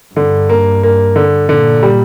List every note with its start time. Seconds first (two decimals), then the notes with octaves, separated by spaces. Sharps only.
0.15 G2 D3
0.49 A#3
0.83 A#3
1.16 D3
1.49 A#2 D3
1.83 G3